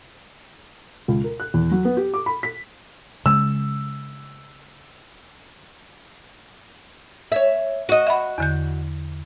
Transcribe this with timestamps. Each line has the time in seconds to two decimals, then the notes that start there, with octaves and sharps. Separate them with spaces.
1.08 C#2
1.24 A#4
1.40 F#6
1.54 E2
1.71 F#3
1.85 B3
1.97 G4
2.14 D6
2.26 B5
2.43 B6
3.26 C#3 G#3 E6
7.32 C#5 E5
7.89 F#4 D#5
8.07 E5 F#5 B5
8.38 E2 D3 G6